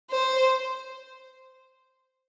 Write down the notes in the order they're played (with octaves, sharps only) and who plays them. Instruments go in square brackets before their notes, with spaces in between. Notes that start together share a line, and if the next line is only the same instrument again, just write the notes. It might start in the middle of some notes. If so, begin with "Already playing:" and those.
[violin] C5